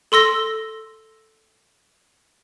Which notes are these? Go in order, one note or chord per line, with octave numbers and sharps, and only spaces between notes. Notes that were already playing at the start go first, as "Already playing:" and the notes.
A4 C6 E6 A#6